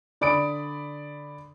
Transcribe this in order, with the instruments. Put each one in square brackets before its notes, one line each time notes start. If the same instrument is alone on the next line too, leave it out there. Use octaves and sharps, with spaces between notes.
[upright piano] D3 D5 B5 D#6 D7